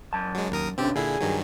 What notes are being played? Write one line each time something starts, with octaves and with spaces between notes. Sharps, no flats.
F#2 A5
F#3 G#3
D#2 A#4 D#6
B2 D3 C4 C#4 G4
A#2 D3 E4 G#4
G2 D#3 F#3